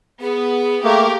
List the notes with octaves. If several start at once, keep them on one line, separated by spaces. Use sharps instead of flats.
B3 G#4
A3 A#3 G4 A#4